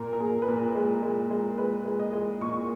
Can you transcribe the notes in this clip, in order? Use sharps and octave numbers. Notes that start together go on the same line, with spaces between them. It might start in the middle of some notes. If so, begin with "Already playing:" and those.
Already playing: A#2 A#4
A#4
A#2 G#4
B4
A#2 A#4
G#3
G#3
G#3
G#3 B4
G#3
D#5
G#3
A#2 C#6